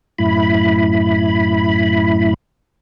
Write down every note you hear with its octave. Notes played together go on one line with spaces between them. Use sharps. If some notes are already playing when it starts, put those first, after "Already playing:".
F#2 A2 E4 B5